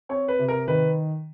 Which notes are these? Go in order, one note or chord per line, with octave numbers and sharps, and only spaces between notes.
C4 C#5
B4
C3
A#4
D#3 B4